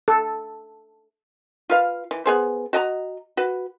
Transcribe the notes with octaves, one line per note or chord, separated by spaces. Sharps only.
A4
F4 B4 F5
E3
B3 G#4 C5
F#4 D#5 A5 A#5
F#4 B4